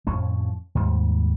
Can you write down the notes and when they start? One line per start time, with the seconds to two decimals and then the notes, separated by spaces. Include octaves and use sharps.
0.07 F2 A2 F3 C#4
0.75 D#2 G#2 G3